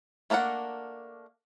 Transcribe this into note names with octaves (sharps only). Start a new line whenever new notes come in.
A3 A#3 D4 A#4 F#5